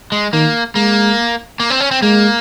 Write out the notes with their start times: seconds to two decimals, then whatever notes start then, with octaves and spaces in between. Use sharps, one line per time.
0.12 G#3
0.33 D#3 A#3
0.75 G#3 A#3
1.60 A#3
1.70 C4
1.80 C#4
1.91 C4
2.02 G#3 A#3